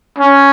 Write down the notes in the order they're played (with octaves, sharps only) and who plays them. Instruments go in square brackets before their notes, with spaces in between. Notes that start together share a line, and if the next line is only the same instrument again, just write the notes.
[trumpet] C#4